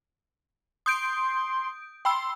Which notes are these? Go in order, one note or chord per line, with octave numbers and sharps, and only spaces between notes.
C6 D#6 G6 D7
G5 B5 C6 E6